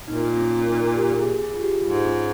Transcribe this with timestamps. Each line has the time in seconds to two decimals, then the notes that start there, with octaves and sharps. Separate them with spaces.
0.08 A#2 D#4
0.37 C#4
0.66 D#4
0.95 G4
1.17 G#4
1.39 G#4
1.53 F4
1.61 G4
1.82 G#2 F4
2.05 C#4